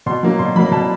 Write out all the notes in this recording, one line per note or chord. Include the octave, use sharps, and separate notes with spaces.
B2 C6
F#3 A#3
B2 C6
F#3 A#3 B5
B2 A5